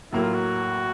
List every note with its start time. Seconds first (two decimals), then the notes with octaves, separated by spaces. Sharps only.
0.12 A2 F#3 A#3 E4
0.22 F4
0.34 F#4